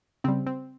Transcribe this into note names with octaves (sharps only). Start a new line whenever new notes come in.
C#3 G3 C4
C4